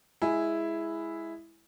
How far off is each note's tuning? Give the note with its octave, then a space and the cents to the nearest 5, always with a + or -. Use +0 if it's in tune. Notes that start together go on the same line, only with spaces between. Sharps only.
G#3 +0 E4 +0 G#5 +0